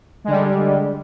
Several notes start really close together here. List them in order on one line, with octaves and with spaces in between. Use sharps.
G#3 D3 G3